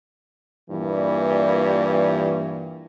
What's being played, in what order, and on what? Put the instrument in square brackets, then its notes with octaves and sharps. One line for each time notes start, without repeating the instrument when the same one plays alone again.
[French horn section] G2 A#2 E3